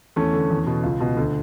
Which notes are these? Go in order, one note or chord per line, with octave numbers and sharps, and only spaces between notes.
E2 A3 C#4
D3
E2
B2
C#2
B2
D2